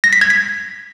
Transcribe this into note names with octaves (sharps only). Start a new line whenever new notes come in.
A#6
B6
G#6
B6